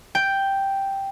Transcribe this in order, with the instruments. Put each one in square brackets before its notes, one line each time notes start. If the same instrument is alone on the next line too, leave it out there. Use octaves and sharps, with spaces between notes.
[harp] G5